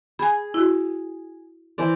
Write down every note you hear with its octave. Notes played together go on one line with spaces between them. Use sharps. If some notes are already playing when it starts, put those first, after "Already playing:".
G#4 G#5 B5
E4 F#4
E3 C5 D5